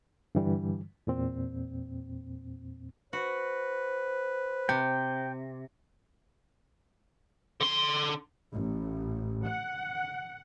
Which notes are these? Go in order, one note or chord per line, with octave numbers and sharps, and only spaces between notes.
G2 D3 E3 G3
E2 A#2 C4
F#4 B4 C5
C3 G5
D3 C6
A1
F#5